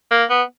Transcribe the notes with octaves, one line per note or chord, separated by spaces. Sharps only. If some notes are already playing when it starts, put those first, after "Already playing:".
A#3
B3